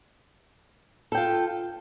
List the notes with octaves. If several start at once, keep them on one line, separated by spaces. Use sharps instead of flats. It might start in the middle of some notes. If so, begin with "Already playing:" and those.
F4 A4 G5